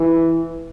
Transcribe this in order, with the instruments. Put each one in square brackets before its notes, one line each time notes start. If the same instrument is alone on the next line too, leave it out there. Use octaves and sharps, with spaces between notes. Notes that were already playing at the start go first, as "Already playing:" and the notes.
Already playing: [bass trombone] E3